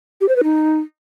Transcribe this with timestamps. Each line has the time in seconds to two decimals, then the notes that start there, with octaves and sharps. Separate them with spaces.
0.21 G4
0.29 C5
0.36 B4
0.44 D#4